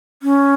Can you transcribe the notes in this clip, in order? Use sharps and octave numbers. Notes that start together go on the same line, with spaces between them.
C#4